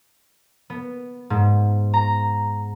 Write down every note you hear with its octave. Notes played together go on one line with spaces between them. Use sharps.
B3
G#2
A#5